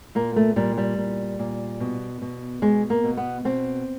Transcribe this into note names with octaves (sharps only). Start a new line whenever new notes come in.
A#2 A#3
A3
A#2 G3
G3
A#2
A#2
B2
B2
B2 G#3
A#3
B2
B3
B2 C4